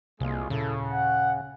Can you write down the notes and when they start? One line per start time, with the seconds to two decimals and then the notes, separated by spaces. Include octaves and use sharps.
0.20 C2 C3 G#3 A#3 F4 G#4
0.50 D#1 A#2 C#3 E4 A4
0.86 F#5